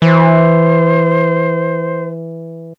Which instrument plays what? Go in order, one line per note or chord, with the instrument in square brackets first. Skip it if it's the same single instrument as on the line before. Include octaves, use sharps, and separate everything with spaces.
[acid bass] E3 [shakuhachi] C5